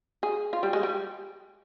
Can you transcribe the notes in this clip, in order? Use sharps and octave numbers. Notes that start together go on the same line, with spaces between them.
G#4
F4
G3
G#3
G3